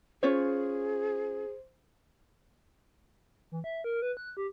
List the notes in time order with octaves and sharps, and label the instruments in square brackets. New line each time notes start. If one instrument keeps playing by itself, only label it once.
[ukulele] C#4 F4 C#5 [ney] G#4 [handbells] C5
[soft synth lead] E3
E5
A#4
B4
F#6
G4